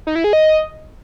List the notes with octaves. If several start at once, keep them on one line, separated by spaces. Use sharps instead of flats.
D#4
E4
G#4
D#5